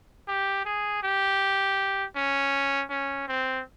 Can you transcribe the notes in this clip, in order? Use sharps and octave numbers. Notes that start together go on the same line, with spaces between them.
G4
G#4
G4
C#4
C#4
C4